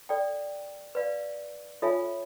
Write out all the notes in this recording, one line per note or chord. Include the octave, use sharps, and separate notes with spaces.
A4 D5 G5
B4 D5 F5
F4 A4 C#5 E5 G#5